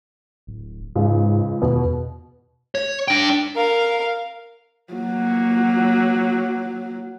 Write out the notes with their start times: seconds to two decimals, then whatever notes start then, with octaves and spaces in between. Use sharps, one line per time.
0.47 D1
0.96 C#2 G#2
1.62 E2 B2
2.75 C#5
3.08 D4 G5
3.55 A#4 F5
4.93 F#3 A#3